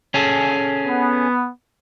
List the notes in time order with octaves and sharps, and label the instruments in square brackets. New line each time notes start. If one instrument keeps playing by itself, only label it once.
[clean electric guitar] C#4 G#4 A4
[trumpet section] B3